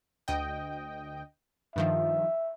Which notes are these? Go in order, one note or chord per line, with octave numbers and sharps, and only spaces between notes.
D2 D#5 G5
G2 D#3 F3 E5